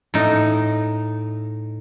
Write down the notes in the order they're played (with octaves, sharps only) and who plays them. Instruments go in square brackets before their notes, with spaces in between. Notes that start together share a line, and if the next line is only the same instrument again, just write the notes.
[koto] A2 D#4